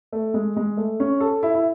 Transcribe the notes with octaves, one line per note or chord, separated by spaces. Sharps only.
A3
G#3
G#3
A3
C#4
A4
E4
E4